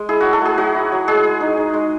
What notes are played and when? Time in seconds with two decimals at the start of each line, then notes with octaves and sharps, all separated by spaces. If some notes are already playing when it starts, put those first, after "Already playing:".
Already playing: G#3
0.09 E4 G#4
0.20 F#3 F#4
0.33 A4
0.42 A3 G#4
0.58 F#3 F#4
0.75 E4
0.92 F#3
1.08 G#3 G#4
1.25 G#3
1.41 D#4
1.57 D#4
1.74 G#3